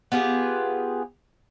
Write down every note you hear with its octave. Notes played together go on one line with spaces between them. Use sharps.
B3 F4 G4 G#4